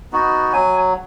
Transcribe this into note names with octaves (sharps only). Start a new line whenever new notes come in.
B3 D#4 F#4
F#3 G#5